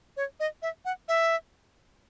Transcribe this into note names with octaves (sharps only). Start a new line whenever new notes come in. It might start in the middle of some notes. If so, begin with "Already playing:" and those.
C#5
D#5
E5
F#5
E5